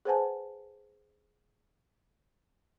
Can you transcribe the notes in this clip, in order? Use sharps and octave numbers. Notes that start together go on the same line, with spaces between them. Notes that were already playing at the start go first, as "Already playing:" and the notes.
G#4 B4 C5 F#5 G#5 A5